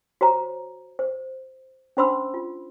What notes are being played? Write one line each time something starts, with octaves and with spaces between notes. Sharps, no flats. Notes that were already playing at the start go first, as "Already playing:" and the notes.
F#4 C5 C#5 A#5
C5
C#4 D4 C5 B5 C6 E6
F4